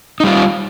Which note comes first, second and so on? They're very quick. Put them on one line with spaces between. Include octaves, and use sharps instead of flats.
D#4 G3 F4